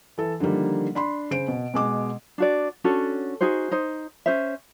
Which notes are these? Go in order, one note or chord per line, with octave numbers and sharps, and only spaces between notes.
E3 A4
D3 D#3 F3 G3 A#3
D4 B5 C6
C#3 C5 D7
B2
B2 G#3 D6
D4 F#4 D5
C#4 D4 F#4 A4
D#4 F#4 G#4 C5
D#4 C5
C#4 C5 E5